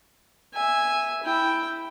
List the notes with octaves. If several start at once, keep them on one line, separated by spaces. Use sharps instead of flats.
E5 G#5
E4 G5